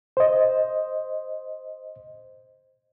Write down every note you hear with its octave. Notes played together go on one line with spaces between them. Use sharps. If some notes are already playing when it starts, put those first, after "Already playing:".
C5 D#5